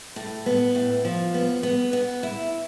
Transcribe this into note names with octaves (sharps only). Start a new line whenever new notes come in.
A2
B3
A2
F3
B3
B3
B3
E4